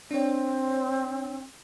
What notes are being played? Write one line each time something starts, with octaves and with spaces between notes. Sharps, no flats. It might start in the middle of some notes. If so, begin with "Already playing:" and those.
C4 D4 C#5